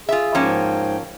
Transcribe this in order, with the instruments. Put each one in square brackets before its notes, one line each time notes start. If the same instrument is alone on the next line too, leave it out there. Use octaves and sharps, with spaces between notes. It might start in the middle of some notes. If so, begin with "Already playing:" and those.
[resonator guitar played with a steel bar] F4 E5 [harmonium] G#4
[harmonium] G#2 G5 [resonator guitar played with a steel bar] F3 A#3 C#4